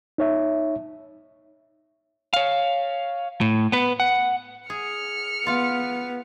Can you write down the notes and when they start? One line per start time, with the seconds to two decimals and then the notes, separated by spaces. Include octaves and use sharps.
0.18 D#4 C#5 E5
2.33 C#5 F5
3.41 A2
3.72 B3 B4
4.00 F#5
4.70 G#4 F6 C#7
5.47 B3 F4 F5